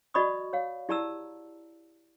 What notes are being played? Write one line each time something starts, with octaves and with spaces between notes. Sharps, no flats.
F#4 D5 D#5 B5 C#6 D#6
C#5 F5
E4 G4 D5 A5 A#5 E6